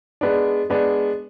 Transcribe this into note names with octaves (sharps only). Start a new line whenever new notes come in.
G#3 B3 D4
G#3 B3 D4